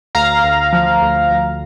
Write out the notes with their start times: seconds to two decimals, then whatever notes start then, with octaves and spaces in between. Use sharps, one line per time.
0.15 D2 F5 A#5
0.43 D2
0.73 F3
1.02 D2
1.30 D2